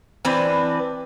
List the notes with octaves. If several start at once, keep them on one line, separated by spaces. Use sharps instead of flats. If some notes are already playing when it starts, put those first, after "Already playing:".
E3 C4 D4 B4